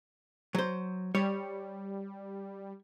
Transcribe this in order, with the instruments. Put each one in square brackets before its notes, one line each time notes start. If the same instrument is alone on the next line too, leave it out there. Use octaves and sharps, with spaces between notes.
[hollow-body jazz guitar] F#3 C5
[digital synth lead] G3 [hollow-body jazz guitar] C#5